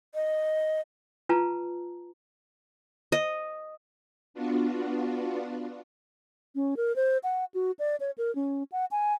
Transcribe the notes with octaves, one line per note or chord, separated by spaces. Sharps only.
D#5
F4 B4 A5 A#5
D#5
B3 D4 F4 F#4
C#4
A#4
C5
F#5
F#4
D5
C#5
A#4
C#4
F#5
G#5